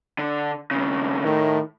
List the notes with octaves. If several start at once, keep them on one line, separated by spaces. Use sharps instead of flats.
D3
D#2 C#3
A2 D#3